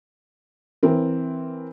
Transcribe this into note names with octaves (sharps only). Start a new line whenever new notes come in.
E3 C4 A#4